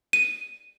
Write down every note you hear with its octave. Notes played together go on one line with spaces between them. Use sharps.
D#7